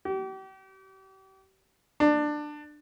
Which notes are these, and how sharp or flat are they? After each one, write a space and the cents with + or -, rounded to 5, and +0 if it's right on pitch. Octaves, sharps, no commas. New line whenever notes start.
G4 -40
D4 +20